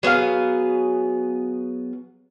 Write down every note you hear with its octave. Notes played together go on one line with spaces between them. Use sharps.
F#3 B3 G#4 F5